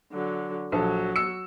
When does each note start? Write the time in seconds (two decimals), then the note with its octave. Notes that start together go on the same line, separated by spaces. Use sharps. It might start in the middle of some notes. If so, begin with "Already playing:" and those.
0.13 D3 F#3
0.72 A#1 F#3 A4
1.16 E6 C#7